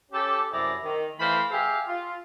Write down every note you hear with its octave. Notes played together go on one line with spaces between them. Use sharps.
C#4 G4 A4
F#2 C3 E4 G#4 D5 A#5
D#3
E3 A3 C5 F5 B5
G4 G#4 E5 F5
F4